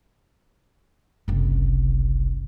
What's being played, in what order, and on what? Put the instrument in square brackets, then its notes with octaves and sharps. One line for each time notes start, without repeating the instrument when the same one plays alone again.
[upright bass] F#1 C2